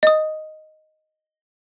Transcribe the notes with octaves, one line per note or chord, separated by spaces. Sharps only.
D#5 D#6